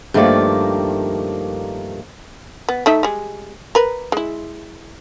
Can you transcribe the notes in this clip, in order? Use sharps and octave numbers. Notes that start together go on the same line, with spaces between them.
G2 D#3 F3 A3 A#3 D5
B3
A3 D#4 E5
G3 G#3
A#4 B4
G#3 E4